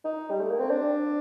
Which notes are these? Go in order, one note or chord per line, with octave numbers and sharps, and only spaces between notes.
D#4
G3
A3
A#3
C4
D4